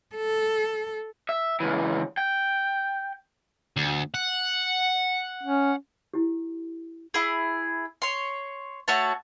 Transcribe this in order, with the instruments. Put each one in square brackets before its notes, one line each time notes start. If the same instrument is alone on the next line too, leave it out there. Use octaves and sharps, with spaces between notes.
[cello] A4
[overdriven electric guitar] E5
C#2 E3
G5
[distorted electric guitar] D2
F#5
[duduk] C#4
[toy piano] E4 G4
[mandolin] E4 G#4
C#5 C6
A3 F#4 C#5 A5